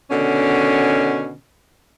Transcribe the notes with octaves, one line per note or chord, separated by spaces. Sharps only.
B2 D3 D#3 C#4